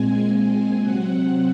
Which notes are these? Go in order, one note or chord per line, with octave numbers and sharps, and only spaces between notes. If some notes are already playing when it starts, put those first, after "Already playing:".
Already playing: A#2 G#3 C4 G#5
G#5
C3 F#3 C4 F#5